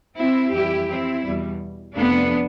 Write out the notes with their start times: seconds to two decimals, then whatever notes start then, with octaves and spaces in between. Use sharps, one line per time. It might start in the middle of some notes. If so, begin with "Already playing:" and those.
0.15 C4 E4
0.52 F2 E3 G3 E4 G4
0.88 C4 E4
1.24 E2 B2 G3
1.96 F2 C3 F3 A3 B3 D4